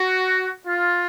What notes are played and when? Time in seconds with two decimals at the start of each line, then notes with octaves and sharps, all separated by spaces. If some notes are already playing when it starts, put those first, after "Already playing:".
Already playing: F#4
0.65 F4